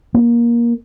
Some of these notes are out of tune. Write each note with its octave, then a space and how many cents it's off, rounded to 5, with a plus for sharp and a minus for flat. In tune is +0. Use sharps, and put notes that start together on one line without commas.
A#3 +20